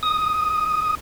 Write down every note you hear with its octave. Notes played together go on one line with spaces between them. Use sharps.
D#6